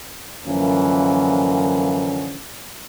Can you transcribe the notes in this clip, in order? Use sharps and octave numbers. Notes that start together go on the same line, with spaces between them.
F#2 D3 E3 F3 A#3 C#4